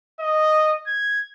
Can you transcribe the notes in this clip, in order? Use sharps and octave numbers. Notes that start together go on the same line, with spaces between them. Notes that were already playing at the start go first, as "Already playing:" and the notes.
D#5
G#6